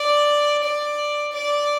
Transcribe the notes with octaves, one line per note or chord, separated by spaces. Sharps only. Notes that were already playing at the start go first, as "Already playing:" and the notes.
Already playing: D5
D5
D5